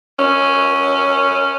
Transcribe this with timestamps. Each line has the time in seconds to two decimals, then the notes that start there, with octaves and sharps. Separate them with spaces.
0.19 C#4